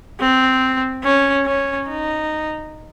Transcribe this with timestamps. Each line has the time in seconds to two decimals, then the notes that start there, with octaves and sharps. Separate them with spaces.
0.20 C4
1.04 C#4
1.46 C#4
1.88 D#4